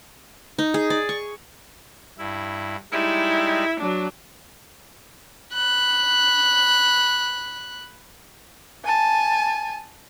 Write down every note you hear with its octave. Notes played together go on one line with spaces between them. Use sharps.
D#4
G#4
D5
C#6
G2 E4
G3 G#3 D#4 E4
F#3 D4
B5 F#6
G#5 A5